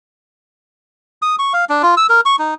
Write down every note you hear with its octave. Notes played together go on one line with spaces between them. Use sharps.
D#6
C#6
F5
D4
F4
E6
A#4
C#6
D#4